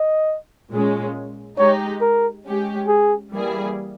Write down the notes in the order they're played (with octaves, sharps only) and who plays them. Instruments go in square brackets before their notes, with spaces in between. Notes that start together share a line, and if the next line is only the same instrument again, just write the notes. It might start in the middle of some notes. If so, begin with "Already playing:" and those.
Already playing: [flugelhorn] D#5
[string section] A#2 G#3 C#4
[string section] G#3 D#4 G4 [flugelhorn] C#5
[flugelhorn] A#4
[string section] G#3 C#4 G4
[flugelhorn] G#4
[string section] E3 G3 A#3 E4 G#4